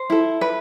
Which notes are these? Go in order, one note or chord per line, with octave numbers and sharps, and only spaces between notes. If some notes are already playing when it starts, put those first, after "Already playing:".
Already playing: C5
E4 A4
B4